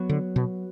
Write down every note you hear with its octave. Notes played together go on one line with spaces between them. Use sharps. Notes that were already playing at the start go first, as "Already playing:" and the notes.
Already playing: F#3 B3 F#4
D3
B2